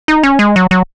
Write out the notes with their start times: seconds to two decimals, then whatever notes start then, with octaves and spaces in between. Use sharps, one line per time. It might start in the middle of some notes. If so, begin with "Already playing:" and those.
0.08 D#4
0.23 C#4
0.39 G#3
0.56 F#3
0.71 F#3